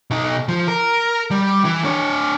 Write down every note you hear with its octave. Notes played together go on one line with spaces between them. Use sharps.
B2 D#4
F3
A#4
G3
E3
D4 C#5